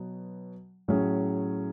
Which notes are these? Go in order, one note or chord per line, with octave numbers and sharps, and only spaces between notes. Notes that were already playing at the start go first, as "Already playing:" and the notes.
Already playing: B2 F#3 B3
A2 F#3 C#4 G#4